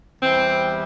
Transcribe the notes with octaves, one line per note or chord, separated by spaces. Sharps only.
E2 E3 G3 C4